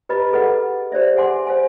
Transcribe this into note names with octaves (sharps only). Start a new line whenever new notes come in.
G4 B4 D#5 A#5 B5
G#4 A4 B4 D#5 F#5
G4 C5 D5 E5
G#4 F#5 G#5 C6 D6
C5 F5 G#5